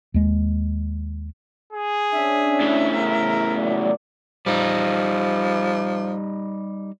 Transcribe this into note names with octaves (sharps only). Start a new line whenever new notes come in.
D#2 G#3
G#4
C#4 D4 E5
A2 C#3
A#4
A#2 F#3 D5
F3 G3 D#4